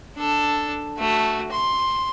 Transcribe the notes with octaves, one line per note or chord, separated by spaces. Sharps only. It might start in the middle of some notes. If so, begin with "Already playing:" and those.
D4 A4
A3 F#4
C6